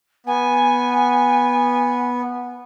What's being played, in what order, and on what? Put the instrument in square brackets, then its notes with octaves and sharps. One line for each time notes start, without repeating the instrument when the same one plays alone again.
[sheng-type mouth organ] B3 [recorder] G#5